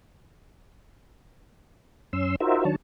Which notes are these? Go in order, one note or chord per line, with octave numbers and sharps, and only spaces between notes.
F#2 C#4 C6 E6
D#4 F4 F#4 A#4 C5 E5
D#3 F#3 D4 C#5 A5